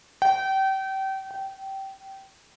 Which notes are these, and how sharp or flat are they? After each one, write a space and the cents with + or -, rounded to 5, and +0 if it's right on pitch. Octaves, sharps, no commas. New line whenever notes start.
G5 -30
G5 -20